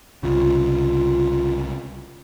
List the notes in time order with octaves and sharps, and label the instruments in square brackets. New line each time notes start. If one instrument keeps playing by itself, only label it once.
[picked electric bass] C2 C#3 [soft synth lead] F4